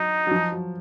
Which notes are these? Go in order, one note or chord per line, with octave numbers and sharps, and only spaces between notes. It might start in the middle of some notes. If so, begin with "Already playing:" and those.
Already playing: F#3 D#4
F#3
F3
F#3